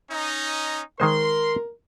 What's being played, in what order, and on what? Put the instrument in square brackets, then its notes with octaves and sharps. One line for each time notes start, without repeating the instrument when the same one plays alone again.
[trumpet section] C#4 D#4
[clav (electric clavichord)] D#3 G#3 C5 [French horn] A#4 [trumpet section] C6